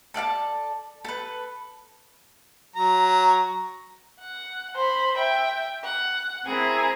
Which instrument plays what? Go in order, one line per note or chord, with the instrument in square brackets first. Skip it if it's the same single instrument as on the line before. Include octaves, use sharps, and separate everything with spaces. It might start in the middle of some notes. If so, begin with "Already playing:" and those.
[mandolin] A4 D5 F5 A5
A4 B4
[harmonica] F#3 A#5
[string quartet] F#5
C5 B5
E5 G5
F#5
C4 E4 G#4 A#4